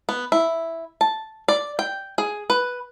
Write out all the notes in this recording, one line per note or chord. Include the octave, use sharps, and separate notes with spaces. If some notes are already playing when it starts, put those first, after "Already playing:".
B3
E4
A5
D5
G5
G#4
B4